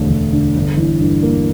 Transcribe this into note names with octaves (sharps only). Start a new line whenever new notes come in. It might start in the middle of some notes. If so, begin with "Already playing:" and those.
Already playing: E1 D2 D3 A3
E1
D3
G1
E3
G2
A#3